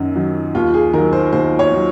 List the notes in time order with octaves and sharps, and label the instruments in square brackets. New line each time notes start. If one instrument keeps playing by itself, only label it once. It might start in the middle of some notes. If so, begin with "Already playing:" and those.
Already playing: [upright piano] F#2 D#3 F#3
D#3 F#3
D#2 F4
G#4
D#3 F#3 A#4
C5
D#2 C5
C#5
D#3 F#3